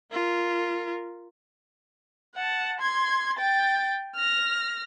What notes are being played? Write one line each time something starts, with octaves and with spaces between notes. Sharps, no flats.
F4 A#4
F#5 A5
C6 G#6
G5 A6
F6 A#6